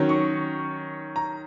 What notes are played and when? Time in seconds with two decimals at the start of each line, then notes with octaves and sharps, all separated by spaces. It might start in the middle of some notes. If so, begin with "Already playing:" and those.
Already playing: D#3 F#3 C#4
0.09 C#6
1.16 A#5